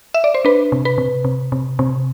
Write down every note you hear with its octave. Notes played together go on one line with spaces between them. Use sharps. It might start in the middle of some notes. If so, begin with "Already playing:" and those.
E5
D5
C5
D4 B4
C3
B4
C3
C3
C3
C3